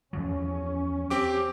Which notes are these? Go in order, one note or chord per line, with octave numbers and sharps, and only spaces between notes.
E2 F3 F#3 C#4
C4 G4 D6